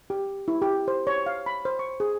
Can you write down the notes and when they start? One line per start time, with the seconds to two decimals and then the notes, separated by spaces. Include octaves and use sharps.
0.10 G4
0.48 E4
0.62 G4
0.88 C5
1.07 C#5
1.26 F5
1.46 B5
1.65 C5
1.79 C#6
2.00 G#4